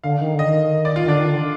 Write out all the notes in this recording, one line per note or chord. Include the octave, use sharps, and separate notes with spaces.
D3 F5
D#3
D3 D#5
D#3
D5
F4
D#3
D3 D4
D#3
D3